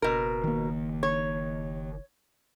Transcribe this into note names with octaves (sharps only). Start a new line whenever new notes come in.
F#1 B2 A#4
D#3 A#3
C#5